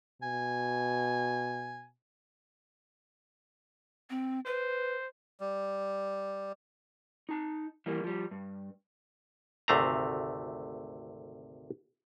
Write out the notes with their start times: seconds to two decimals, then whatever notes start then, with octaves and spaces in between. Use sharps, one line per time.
0.23 B2 G#5
4.10 C4
4.46 B4 C5
5.40 G3
7.29 D#4 A5
7.86 E3 G3 A#3
8.04 F3 G3
8.31 G2
9.68 G#1 D2 C3 A3 F5 A#5